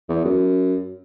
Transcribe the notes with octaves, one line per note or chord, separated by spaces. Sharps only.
E2
F#2